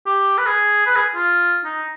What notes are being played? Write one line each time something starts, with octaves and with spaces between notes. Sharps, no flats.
G4
B4
G#4
B4
G#4
F4
D#4